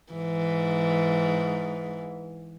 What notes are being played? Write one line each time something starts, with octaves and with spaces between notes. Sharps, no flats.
G#2 E3